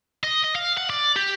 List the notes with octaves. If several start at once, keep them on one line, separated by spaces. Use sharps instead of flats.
D#5
D#5
F5
F#5
D5
G4